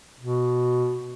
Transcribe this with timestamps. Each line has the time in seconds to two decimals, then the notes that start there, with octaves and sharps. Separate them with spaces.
0.20 B2